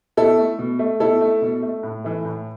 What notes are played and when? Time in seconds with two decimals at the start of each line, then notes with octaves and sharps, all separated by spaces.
0.17 B2 E4 A4
0.38 A3
0.59 B2
0.79 A3
1.00 B2 E4 A4
1.21 A3
1.42 B2
1.62 A3
1.83 A2
2.04 E3 A3
2.25 A2